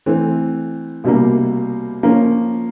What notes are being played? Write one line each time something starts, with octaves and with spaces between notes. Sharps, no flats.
E3 A3 C4
C2 B2 G3 A#3
F3 A#3 C#4